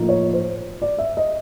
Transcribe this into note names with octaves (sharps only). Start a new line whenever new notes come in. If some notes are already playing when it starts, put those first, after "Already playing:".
Already playing: A2 F3 A#3 D#4
C#5
C5
D5
E5
D#5